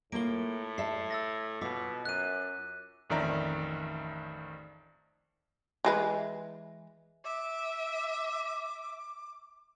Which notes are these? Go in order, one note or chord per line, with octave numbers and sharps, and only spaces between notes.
A2 A#3 F4 D7 G7
A4 E5 C7
E6 A6 A#6
B2 F4 D6 E6 B6
F#2 F#6 D#7
A1 F2 D#3 D5 E5 A#5
E3 G#3 B4
E5 D6